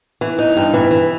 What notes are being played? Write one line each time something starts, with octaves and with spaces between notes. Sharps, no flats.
E3
D#4
G2
E3
E3